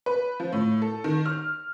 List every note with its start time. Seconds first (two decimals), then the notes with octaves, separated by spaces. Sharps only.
0.06 B4
0.40 F3
0.53 A2
0.82 A4
1.04 D#3
1.26 F6